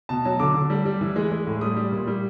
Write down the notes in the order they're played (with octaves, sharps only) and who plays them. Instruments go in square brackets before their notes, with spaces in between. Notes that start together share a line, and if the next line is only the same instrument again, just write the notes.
[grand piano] B2 A5
F#3
D3 D6
D3
G3
G3
E3
G#3
G#3
A2
G3 D#6
G3
A#2
G3